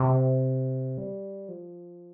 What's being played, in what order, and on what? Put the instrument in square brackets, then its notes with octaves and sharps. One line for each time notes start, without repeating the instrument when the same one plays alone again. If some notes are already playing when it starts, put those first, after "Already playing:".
Already playing: [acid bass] C3
G3
F3